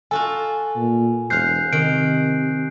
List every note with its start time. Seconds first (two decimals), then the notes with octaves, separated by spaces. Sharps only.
0.11 F4 F#4 A4 G#5
0.77 A#2
1.30 E1 C5 F5 F#6 G6 C7
1.73 C3 D#3 D7